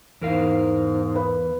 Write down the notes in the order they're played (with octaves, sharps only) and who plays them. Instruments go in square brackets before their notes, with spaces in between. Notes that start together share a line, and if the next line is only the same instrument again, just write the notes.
[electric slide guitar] E2 A#4 F5 [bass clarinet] G#2
[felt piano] B4